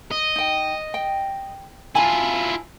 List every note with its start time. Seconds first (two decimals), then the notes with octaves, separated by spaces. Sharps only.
0.11 D#5
0.36 D#4 G5
0.94 G5
1.95 E4 F4 G#5 A5 B5